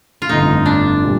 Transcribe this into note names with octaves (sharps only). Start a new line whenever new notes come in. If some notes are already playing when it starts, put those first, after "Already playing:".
F4
G1 F2 D3 A3 D#4
D4
A#2 G3